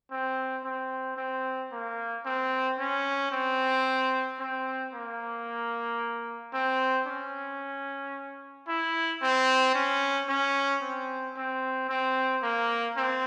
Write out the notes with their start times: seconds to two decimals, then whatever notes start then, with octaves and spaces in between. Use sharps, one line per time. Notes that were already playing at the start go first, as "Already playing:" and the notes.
0.11 C4
0.65 C4
1.17 C4
1.72 A#3
2.25 C4
2.79 C#4
3.31 C4
4.39 C4
4.93 A#3
6.53 C4
7.07 C#4
8.68 E4
9.22 C4
9.75 C#4
10.29 C#4
10.82 C4
11.36 C4
11.89 C4
12.42 A#3
12.97 C4